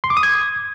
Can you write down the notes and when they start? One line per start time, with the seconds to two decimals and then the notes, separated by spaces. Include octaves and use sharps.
0.04 C6
0.10 D6
0.17 D#6
0.23 G#6